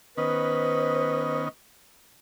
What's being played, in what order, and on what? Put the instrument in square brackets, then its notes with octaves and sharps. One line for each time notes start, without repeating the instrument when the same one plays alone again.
[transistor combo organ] D#3 B3 C#4 [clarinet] B4 [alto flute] C5 [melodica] D#5